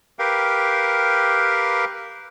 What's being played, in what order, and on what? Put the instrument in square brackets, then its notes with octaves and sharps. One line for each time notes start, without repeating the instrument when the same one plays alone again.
[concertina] G4 A#4 B4 F5 G5